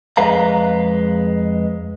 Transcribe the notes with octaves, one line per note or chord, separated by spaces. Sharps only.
F2 G#3 B4 F5 A#5